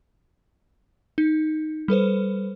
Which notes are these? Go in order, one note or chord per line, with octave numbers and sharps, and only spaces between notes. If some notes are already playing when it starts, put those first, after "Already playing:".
D#4
G3 A4 B4 C5